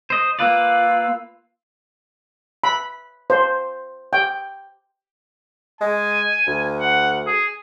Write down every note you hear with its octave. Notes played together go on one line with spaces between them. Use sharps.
C5 D#5
A#3 F4 B4 D5 F5 E6
B5
C5
G5
G#3 G#5
D2
F#5
G#4